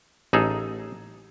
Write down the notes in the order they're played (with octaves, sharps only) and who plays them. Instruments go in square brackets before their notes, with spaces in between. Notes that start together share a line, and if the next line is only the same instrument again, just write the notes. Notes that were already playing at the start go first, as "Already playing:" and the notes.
[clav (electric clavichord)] A1 D#4 G#4 A4